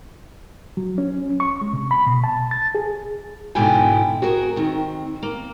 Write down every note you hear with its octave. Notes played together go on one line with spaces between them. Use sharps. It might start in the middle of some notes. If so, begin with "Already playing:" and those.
F#3
C#4
C#6
G#3
C3
B5
B2
A5
A6
G#4
G#2 B2 D3 E4 G5 G#5
F#4 G#4 A#4
D#3 C4
A#3